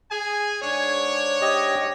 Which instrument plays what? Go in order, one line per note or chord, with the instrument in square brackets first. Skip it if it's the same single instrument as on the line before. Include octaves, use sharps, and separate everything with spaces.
[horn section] G#4 G#5
G#2 D4 C#5
[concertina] G4 D#5